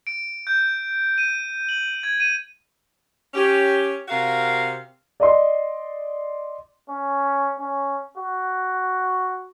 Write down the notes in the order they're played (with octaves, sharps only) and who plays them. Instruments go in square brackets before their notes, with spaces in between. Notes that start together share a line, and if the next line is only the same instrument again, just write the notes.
[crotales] D7
G6
D#7
F#7
G#6
D#7
[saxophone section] C#4 G4
C3 F#4 A#4 F5
[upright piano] D5 D#5 C6
[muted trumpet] C#4
C#4
F#4